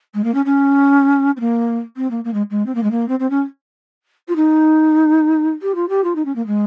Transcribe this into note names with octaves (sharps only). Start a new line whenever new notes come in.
G#3
A#3
C#4
C#4
C4
A#3
C4
A#3
A#3
G#3
G#3
C4
A#3
G#3
A#3
C4
C4
C#4
F4
D#4
G4
F4
G4
F4
D#4
C#4
A#3
G#3